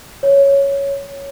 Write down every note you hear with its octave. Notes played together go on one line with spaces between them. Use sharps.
C#5